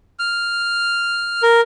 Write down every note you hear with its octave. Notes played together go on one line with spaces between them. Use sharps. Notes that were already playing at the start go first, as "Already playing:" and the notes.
F6
A#4